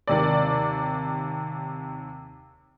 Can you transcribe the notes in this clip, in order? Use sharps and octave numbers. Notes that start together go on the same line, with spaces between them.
D#2 C3 D5